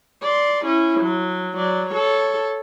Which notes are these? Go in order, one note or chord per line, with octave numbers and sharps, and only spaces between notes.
D5 C6
C#4 E4
F#3
F#3 D5
A4 C#5